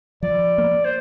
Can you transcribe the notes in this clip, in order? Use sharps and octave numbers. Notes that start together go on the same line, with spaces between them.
F3 D5
A#3
C5